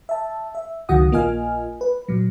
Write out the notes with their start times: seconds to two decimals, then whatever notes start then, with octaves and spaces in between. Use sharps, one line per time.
0.09 E5 A5
0.55 E5
0.89 C#2 D#3 F#3 F#4 F#5 D#6
1.12 A#1 A#3 F4 D#5 G#5 F6
1.81 B4
2.08 A#2 F#3